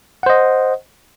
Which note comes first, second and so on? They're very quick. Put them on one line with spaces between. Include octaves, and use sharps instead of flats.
F#5 C5 D#5